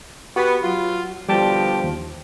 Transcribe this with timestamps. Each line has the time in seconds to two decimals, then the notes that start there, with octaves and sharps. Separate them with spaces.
0.36 B3 F#4 G4 B5
0.63 F#3 F4
1.29 B2 D3 F3 G3 G4 A5
1.84 D#2